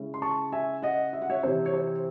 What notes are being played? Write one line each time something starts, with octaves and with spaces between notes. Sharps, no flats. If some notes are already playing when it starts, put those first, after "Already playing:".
Already playing: C#3 G#3 C#4 E4
C6
A5 C#6
E5 G#5
D#5 F#5
E5
F#5
C#5 E5
C3 E3 C4 C5
C#5
C5